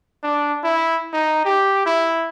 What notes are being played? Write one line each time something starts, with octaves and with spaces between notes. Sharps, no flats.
D4
E4
D#4
G4
E4